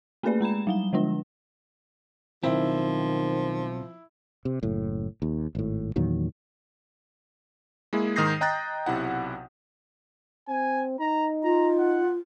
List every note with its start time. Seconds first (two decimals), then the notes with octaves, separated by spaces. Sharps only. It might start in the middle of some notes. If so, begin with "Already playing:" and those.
0.23 A3 A#3 C#4 G#4 B4 D5
0.41 G#3 A#5 B5 E7
0.67 F#3 G3 G7
0.93 D3 F3 G#3 D4
2.43 B1 D#3 F3 C4 E4
4.45 C3
4.63 F#1 A2
5.22 D#2
5.55 G#1 A2
5.96 E2 A#2 D#3 F#3
7.93 G#3 A#3 E4 G#4
8.16 G#2 D#3 D#6 G6 A#6 C7
8.41 D#5 G5 A#5 F#6 G6 A6
8.86 B1 C3 E4 F#5
10.48 C4 G#5
11.00 D#4 A#5
11.44 F4 A#5
11.79 F#5